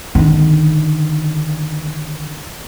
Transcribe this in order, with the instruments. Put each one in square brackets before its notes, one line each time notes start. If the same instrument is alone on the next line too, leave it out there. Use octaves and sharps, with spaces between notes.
[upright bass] D3 D#3